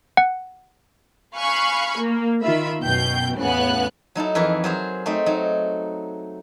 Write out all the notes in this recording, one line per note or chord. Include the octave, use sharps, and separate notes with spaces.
F#5
F5 G#5 B5 C#6 F#6
A#3
D#3 F4 E5 B5
F#2 B2 G5 G6
E2 A2 C#3 B3 G#5 F#6
F#3 D#4 E4 A4
F2 E3 G#4 A#4 B4
F#3 G#4 C5
A3 C4 D#4 D#5
F#3 D#4